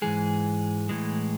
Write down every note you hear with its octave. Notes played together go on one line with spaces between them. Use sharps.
G#2 E3 G#3 G#4
A2 E3 G#3